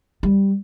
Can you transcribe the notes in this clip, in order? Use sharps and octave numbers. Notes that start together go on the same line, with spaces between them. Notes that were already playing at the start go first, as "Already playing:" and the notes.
G3